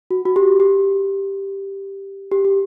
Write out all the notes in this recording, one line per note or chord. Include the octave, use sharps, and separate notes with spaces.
F#4
F#4
G4
G4
G4
G4